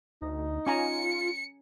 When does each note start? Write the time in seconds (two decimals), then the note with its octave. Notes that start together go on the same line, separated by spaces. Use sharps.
0.22 D2 D#4
0.67 C#4 F4 G#5 A#5 C#7